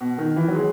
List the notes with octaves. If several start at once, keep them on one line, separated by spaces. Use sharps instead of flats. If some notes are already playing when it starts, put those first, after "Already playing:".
B2
D#3
E3
F#3
G#3